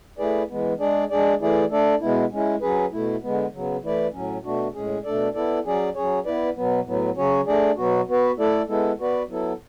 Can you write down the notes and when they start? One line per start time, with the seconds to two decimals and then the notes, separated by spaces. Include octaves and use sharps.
0.18 A3 E4 G#4 B4 D5
0.49 E3 G#3 B3
0.79 G#3 D4 G#4 D5
1.10 G#3 D4 G#4 D5
1.40 E3 A3 E4 G#4 D5
1.70 A3 D4 A4 D5
2.01 B2 G#3 B3 E4
2.32 G#3 C#4 E4
2.61 F#3 C#4 G#4 B4
2.92 B2 A3 E4
3.22 D3 G#3 B3
3.53 C#3 F#3 B3
3.83 E3 A3 E4 B4 D5
4.13 A2 F#3 C#4
4.43 B2 A3 D4 F#4
4.74 A2 G#3 C#4 G#4
5.04 B2 A3 D4 A4 D5
5.35 B3 E4 A4 D5
5.65 F#3 C#4 G#4 D5
5.95 F#3 C#4 G#4 C#5
6.25 B3 E4 B4 D5
6.56 B2 F#3 B3
6.86 A2 F#3 B3
7.17 C#3 F#3 C#4 F#4 C#5
7.47 A3 D4 G#4 D5
7.77 B2 F#3 B3 F#4
8.08 B3 F#4 B4
8.38 A3 E4 A4 D5
8.68 G#3 B3 E4 A4
8.99 B3 F#4 B4 D5
9.29 F#3 B3 E4 A4